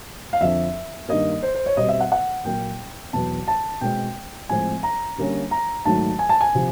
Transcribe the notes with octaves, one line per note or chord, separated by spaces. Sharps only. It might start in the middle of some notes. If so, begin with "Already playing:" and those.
F5
F2 D3 F3 E5
G2 D#3 G3 A#3 D#5
C5
C5
C#5
B2 G3 C4 D#5
E5
F#5
F#5
A#2 F#3 A#3 G5
E2 B2 F#3 B3 A5
A5
B2 G#3 C4 G5
A2 F3 G#3 C4 G#5
A#5
D3 G3 A#3 C#4
A#5
G#2 D#3 F#3 A3 A5
G#5
A5
G#5
C3 F3